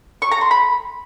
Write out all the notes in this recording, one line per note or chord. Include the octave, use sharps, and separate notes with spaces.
C#6
A#5
C6
B5